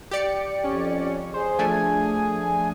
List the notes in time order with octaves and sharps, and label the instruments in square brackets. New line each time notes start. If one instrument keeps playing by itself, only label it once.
[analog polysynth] G4 D5 C#7
[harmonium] F2 [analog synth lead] C#4
[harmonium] G#4 [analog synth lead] C5
[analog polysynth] F3 A3 D4 [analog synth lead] G#5